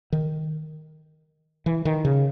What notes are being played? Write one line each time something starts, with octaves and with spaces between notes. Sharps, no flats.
D#3
E3
D#3
C#3